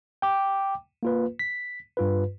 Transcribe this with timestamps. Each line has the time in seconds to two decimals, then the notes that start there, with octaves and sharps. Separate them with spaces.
0.22 G5 D6
1.03 A#3 F4 B4
1.39 B6
1.97 G2 F4 B4